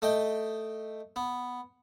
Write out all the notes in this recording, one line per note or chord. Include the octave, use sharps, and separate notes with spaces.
A3 D#5 G5
B3